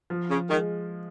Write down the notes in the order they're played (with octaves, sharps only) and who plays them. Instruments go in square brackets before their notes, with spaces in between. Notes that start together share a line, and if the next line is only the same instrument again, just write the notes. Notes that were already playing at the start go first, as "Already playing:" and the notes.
[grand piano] F3
[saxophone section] C#3
[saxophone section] D#3 [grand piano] G#3